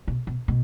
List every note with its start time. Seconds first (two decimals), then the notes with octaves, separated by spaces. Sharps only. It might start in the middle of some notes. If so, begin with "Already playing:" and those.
0.08 B2
0.27 B2
0.48 B2